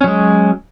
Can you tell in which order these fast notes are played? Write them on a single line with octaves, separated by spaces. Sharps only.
C#4 F#3 G#3